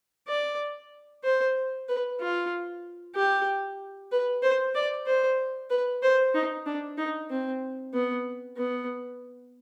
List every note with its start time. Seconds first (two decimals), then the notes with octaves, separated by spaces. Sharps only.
0.28 D5
1.24 C5
1.88 B4
2.20 F4
3.16 G4
4.12 B4
4.43 C5
4.75 D5
5.06 C5
5.70 B4
6.03 C5
6.34 D#4
6.66 D4
6.98 D#4
7.30 C4
7.93 B3
8.57 B3